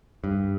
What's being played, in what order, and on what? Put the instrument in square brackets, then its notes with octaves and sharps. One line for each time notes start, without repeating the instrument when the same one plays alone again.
[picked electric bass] G2